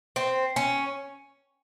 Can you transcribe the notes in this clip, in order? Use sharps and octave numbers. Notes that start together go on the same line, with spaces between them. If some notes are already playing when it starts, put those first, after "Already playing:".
C4
C#4